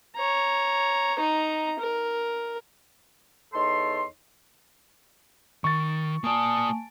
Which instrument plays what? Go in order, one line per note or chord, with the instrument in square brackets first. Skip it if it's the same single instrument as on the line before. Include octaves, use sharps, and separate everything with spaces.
[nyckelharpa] C#5 A#5
D#4 A#5
A#4
[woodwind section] E2 D#4 A4 C#5 C6
[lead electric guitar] D#3 [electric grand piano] C#6 A6
[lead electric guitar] A#3 D5 [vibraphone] G#5 A5 [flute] D#6